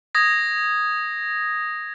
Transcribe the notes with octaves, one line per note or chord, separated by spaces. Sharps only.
D#6 G#6 A#6